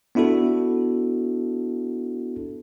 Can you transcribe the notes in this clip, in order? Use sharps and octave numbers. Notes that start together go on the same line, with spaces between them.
B3 D4 E4 F#4 A4